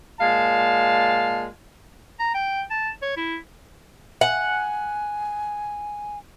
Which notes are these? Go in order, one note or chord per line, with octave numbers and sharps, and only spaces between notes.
A#2 G#3 F5 A5
A#5
G5
A5
C#5
E4
F#5 G#5